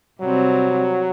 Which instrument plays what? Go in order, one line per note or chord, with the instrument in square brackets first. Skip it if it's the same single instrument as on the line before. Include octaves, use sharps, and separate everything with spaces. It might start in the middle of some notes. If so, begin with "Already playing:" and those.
[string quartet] C3 G3 C4 [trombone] F#3